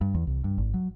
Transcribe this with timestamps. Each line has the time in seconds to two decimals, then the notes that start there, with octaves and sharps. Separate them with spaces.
0.01 G2
0.15 E2
0.27 C2
0.44 G2
0.58 G#1
0.74 F#3